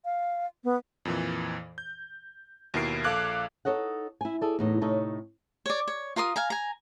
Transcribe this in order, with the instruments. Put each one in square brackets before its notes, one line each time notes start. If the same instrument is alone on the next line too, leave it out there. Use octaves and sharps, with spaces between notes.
[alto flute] F5
B3
[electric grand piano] F2 A#2 E3
G6
D#2 B2 E4 A#4 C7 D7
A#1 A4 F5 D6 F#6 G#6
[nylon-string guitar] D#4 A4 C#5 D#5 F#5
E4 G#5
G#4 A4 D5
E2 A2 D#4
A2 C3 D#4 A4 C#5 D#5
[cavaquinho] C#5 D5
C#5
F4 A#4 C6 D#6
F5 G#5 A#5
G#5 A#5